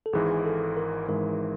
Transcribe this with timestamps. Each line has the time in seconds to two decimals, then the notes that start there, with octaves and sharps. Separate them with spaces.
0.06 A4
0.13 G#1 G#2 E3 G#3 G#4
0.45 A4
0.77 A#4
1.08 G#1 G#2 E3 G#3 A#4